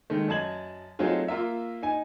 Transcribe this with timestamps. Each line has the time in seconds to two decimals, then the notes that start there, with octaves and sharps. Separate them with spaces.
0.10 D#3 G#3 A3
0.28 F#2 D#5 A5 G#6 F#7
0.99 F#3 A3 C4 D#4 F4 G#4
1.28 A#3 F4 A#4 E5
1.83 D#4 G#5